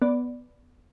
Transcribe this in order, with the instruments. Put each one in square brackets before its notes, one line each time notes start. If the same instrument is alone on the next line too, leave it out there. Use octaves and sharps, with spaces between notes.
[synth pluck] B3 D5